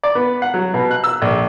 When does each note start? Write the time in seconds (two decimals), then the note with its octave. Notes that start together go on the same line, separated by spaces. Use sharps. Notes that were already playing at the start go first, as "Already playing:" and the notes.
0.04 D5
0.15 B3
0.42 F#5
0.54 F#3
0.74 B2
0.91 F#6
1.04 E6
1.22 A#1